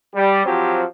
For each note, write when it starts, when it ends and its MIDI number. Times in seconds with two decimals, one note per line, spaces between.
0.14 0.43 55
0.45 0.84 53
0.45 0.84 54
0.45 0.84 60
0.45 0.84 65
0.45 0.84 67